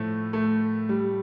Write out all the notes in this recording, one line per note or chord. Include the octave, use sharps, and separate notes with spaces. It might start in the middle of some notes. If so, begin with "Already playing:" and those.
Already playing: A2 F3 A3
A3
G3